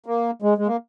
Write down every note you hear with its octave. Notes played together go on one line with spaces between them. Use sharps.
A#3
G#3
G#3
A#3